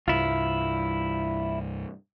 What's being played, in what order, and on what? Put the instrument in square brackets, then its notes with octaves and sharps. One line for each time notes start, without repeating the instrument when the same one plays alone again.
[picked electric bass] C2 G2 [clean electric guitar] E4 F4